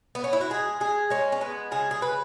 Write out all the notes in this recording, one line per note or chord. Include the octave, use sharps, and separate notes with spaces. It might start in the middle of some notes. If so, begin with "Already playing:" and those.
B3
C#4
E4
F#4
G#3 G#4
G#3 G#4
G#3 C#4
C#4
G#3 B3
C#3 G#4
G#4
C#3 B4